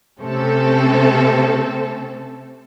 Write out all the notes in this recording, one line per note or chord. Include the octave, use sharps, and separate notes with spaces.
C3 A3 C4 C#4 A4